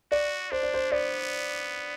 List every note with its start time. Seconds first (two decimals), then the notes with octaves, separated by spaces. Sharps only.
0.11 F#4 D5
0.52 D4 C5
0.63 D5
0.74 C5
0.92 B3 D5